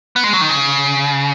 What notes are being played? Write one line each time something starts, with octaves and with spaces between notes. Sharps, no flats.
B3
G#3
F#3
D#3
C#3